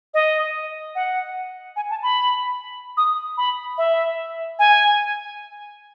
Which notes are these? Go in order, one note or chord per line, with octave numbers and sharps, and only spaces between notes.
D#5
F#5
G#5
A5
B5
D#6
B5
E5
G#5